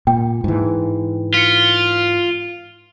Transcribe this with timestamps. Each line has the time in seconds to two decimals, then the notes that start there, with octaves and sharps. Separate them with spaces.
0.07 A#2 G5
0.44 G#2 E3
1.34 F4 B6 C#7